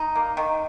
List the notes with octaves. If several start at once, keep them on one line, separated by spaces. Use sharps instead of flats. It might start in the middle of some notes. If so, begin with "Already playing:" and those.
Already playing: D#4
A#3
D#3